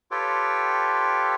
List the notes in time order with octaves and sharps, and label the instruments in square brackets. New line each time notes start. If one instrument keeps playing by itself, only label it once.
[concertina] F4 G4 A4 B4 C#5 G5